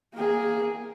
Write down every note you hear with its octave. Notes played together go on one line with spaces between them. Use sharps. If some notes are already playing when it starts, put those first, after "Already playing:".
A#3 G#4